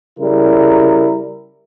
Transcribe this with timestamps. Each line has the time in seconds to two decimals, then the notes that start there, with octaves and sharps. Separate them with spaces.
0.19 C#3 G3 E4 A#4